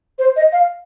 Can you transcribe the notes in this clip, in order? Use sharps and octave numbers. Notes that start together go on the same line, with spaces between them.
C5
D#5
F5